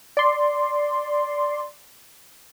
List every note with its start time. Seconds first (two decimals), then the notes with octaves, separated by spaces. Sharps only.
0.17 D5 C6